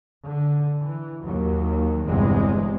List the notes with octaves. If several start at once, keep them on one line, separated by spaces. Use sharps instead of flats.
D3
E3
D#2 F#3
G1 E2 C3 G#3